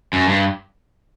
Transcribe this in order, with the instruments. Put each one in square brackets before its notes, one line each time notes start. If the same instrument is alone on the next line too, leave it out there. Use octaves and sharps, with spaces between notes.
[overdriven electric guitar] F#2
G2